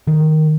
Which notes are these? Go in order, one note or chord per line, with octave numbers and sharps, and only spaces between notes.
D#3